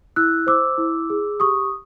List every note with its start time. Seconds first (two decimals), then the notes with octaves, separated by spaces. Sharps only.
0.16 E4 E6 F#6
0.47 C5 D6 E6
0.78 E4
1.10 G#4
1.40 G4 C#6 D#6